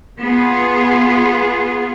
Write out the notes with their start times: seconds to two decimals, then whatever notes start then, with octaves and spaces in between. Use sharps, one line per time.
0.22 B3 F4 G#4